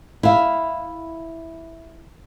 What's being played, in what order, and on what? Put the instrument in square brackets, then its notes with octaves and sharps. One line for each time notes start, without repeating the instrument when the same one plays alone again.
[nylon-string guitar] E4 F5